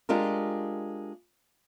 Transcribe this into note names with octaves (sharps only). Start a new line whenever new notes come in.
G#3 D4 F4 G4 A#4